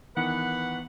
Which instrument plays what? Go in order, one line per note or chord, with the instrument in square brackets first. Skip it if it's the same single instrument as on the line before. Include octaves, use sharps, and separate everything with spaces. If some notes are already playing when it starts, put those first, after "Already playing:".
[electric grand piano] D#3 E3 B3 [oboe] B4 [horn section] F#5